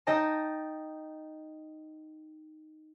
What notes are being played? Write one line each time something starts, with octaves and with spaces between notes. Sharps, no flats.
D#4 D#5 G5 A5 A#6